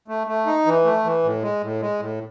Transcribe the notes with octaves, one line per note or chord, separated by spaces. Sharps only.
A3
A3
D#4
E3
A3
E3
A2
G#3
A2
G#3
A2